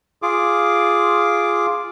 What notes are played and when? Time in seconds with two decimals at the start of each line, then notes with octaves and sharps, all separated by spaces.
0.22 F4 G#4 D6